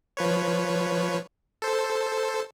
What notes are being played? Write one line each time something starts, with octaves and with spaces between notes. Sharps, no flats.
F3 B4 C#5
A4 C5